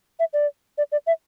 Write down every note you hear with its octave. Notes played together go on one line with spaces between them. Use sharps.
E5
D5
D5
D5
E5